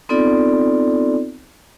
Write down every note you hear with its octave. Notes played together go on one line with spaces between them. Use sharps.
B3 C4 D#4 F4 A4 D5